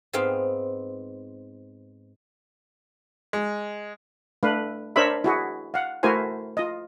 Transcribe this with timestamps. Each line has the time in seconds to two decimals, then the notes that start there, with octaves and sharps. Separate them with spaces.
0.13 G#2 G#3 B3 C4 F5
3.33 G#3
4.43 A3 D4 B4 F5
4.96 D4 A#4 C5 C#5 E5 B5
5.24 E4 F#4 G#4
5.74 F5 F#5
6.03 A3 E4 F#4 A#4 C5 G#5
6.57 F4 D#5